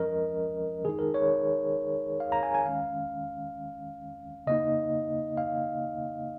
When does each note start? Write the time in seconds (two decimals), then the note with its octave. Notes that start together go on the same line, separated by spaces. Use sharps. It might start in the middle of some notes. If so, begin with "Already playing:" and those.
Already playing: F3 G#3 C#4 A#4 D#5
0.84 D#3 G#3 D#4 G#4
0.99 A#4
1.14 C#5
2.20 F5
2.32 A#5
2.43 G#5
2.54 G#5
2.65 D#3 G#3 C#4 F5
4.47 C#3 A#3 D#4 D#5
5.37 F5